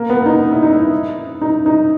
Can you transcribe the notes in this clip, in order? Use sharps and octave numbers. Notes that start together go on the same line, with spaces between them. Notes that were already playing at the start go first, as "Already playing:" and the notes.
Already playing: A#3
B3
D#4
E4
D#4
E4
D#4
D#4